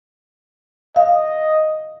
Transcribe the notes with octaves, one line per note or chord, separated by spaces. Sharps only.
D#5 F5